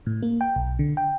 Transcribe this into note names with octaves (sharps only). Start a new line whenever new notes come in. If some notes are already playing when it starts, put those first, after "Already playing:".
A2
A#3
G5
B1
D3
G5